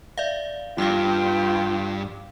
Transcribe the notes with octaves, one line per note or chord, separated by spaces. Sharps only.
D5 E5 F5
G2 F4 F5 G5 D6